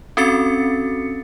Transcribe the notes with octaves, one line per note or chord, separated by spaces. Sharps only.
C4 C#4 F#4 A4 A6 C#7